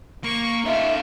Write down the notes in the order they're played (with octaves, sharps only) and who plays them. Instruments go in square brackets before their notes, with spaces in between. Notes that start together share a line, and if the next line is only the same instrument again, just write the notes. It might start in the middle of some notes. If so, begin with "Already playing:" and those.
[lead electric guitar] A#3 [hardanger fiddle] C#6
[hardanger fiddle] A3 F4 [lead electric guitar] C#4 D#4 [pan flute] E5